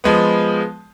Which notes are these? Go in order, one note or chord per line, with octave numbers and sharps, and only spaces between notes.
F3 G#3 B3